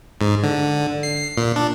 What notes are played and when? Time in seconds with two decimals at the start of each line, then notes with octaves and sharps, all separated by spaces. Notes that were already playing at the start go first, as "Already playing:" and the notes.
0.21 G#2
0.43 D3
1.03 C7
1.37 A#2
1.56 D4